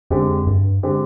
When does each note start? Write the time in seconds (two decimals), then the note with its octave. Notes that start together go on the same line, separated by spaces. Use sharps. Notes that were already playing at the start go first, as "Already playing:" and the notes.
0.10 F2 D3 G#3 C4 G4
0.47 G2
0.83 D3 G#3 C4 G4